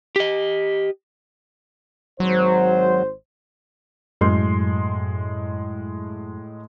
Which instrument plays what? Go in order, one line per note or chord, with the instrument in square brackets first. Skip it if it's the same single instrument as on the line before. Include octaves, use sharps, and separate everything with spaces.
[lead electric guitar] G4 D#5
[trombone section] G#1 C5 [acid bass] F#3
[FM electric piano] F#2 [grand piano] A2 G#3 C6